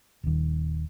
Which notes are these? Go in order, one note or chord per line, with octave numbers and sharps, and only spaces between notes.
D#1 D#2